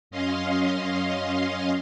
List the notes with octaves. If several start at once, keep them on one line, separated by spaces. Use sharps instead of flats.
F#2 C#4 D#5 F5 C6